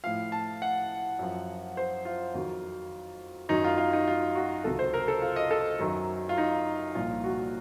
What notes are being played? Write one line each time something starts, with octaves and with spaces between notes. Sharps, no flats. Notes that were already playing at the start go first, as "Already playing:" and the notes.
A2 F3 F5
A5
F#5
F#2 F3
C5
F4
F2 D#3 F#3
F#2 D#3 F#3 D#4
F4
F4
D#4
F4
F#4
C#2 C3 D#3 F#3 A4
C5
A#4
A4
F4
D#5
A4
F#2 D#3 F#3
F4
D#4
C2 A#2 F3 F4
F#4